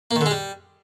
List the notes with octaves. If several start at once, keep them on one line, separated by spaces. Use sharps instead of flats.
A#3
D#3
D3
G#3
G3